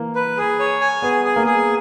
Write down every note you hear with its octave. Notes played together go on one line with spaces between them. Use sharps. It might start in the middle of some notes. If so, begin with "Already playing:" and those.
Already playing: E3 A#3
B4
G#4
C#5
G#5
B3 G#4
G#4
A#3
G#4